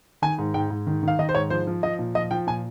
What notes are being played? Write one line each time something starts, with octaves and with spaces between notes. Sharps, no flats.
D#3 G#5
G#2
G#2 G5
G#2
D#3
D#3 F5
D#3 D#5
C5
G#2 C#5
F3 C5
F3
F3 D#5
A#2
F3 D#5
F3 G5
A#2 G#5